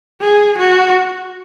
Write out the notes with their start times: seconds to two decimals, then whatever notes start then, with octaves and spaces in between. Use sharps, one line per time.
0.21 G#4
0.58 F#4